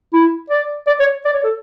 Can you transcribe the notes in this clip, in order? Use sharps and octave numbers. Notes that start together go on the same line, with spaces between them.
E4
D5
D5
C#5
D5
C#5
A4